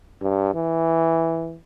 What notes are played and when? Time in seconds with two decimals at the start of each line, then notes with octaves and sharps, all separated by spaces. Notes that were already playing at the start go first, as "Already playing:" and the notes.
0.22 G2
0.55 E3